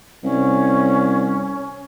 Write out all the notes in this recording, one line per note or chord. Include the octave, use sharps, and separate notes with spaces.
C2 C#4